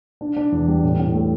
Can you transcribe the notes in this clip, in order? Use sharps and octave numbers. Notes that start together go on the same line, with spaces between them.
D4
D4
E2
G3
A2
A2
A3